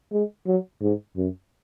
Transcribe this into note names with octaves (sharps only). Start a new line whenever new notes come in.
G#3
F#3
G#2
F#2